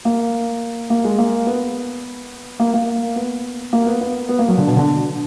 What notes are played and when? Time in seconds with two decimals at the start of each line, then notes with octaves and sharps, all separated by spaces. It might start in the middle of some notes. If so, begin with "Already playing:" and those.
0.05 A#3
0.90 A#3
1.04 G#3
1.18 A#3
1.46 B3
2.60 A#3
2.74 A#3
3.16 B3
3.73 A#3
3.87 B3
4.01 B3
4.29 B3
4.39 A#3
4.48 F#3
4.58 D3
4.67 B2
4.76 D3